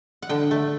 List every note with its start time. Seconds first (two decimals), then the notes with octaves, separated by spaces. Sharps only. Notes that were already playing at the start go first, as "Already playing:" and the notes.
0.22 F#5
0.29 D3 G5
0.51 A3